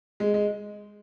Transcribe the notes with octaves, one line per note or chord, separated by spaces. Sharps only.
G#3
G#3